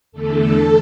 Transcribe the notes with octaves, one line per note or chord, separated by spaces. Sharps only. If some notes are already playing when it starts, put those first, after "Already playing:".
E2 D3 A3 A4